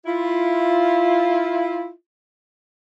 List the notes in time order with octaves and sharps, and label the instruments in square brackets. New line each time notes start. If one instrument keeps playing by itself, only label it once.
[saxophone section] E4 F4